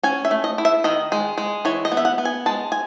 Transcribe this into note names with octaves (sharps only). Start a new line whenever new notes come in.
C#4 G#5
E5
A3
D#5
E4
E5
D#3 D#5
G#3
G#3
E3 C#5
D#5
B3
E5
F#5
B3
G#5
G#3 A5
G#5